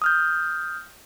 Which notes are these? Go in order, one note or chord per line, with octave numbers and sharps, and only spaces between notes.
D#6 F6 G6